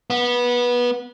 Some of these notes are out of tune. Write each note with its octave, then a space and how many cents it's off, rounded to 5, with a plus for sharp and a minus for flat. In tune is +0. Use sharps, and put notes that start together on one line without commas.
B3 -20